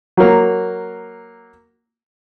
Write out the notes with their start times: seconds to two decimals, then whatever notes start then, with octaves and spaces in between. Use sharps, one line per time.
0.17 F#3 A#3